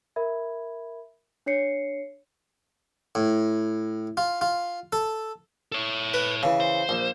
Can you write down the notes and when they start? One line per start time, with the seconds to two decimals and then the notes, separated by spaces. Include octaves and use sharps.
0.16 A#4 E5 B5 G#6
1.46 D4 C#5 C7 C#7
3.15 A2
4.17 F4
4.41 F4
4.93 A4
5.72 A4 C#5
6.14 B4
6.43 C#3 E3
6.60 C5
6.89 A#1